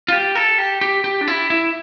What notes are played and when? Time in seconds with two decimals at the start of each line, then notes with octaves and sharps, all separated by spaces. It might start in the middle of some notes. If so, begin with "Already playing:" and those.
0.08 F4
0.12 G4
0.35 A4
0.58 G4
0.81 G4
1.04 G4
1.21 D4
1.27 E4
1.50 E4